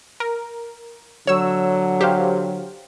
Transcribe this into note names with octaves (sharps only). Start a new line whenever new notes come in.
A#4
D3 F#3 C#5 E6
G4 C5 F5